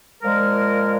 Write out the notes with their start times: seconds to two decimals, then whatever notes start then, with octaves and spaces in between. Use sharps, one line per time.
0.22 A#2 F3 G#3 A#4